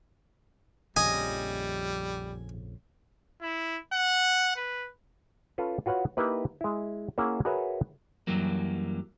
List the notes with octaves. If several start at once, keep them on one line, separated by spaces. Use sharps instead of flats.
A#1 F2 C#3 G3 D#5 G#5
E4
F#5
B4
C#4 F4 A4 B4
F4 F#4 B4 C#5 F#5
A#3 D#4 E4 G4 B4
G#3 E4
A#3 C#4 E4 G#4 E5 F#5
F#4 G#4 A#4 B4 C#5 E5
F#2 E3 F#3 G3 A#3